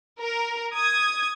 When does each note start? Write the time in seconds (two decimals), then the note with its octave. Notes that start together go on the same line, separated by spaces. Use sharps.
0.20 A#4
0.74 D#6 G#6